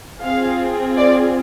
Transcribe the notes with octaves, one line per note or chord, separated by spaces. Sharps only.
C4 F4 G#4 F5
D5